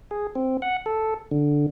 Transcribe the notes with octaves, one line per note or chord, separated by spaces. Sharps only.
G#4
C4
F#5
A4
D3